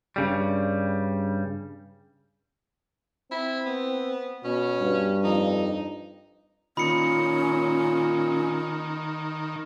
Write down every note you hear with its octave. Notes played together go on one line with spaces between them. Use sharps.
G2 C#3 G3
C4 E4
B3
B2 C#4
G2
F2 D#4
A#2 D#3 C#4 B5 C#7